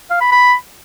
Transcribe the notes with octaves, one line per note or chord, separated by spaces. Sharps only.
F5
B5
B5